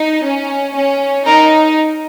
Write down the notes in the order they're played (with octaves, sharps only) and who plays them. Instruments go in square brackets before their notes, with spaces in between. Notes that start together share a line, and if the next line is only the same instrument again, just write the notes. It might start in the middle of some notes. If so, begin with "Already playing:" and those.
Already playing: [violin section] D#4
C#4
C#4
[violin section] D#4 [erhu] A#4